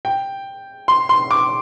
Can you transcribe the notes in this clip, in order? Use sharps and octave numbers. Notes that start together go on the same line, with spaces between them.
G5
C6
C6
D6